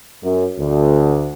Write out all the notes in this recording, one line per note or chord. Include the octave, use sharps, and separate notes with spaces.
F#2
D2